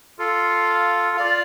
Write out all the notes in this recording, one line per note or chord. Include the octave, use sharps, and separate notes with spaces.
F4 A4 F5
F4 D5 F5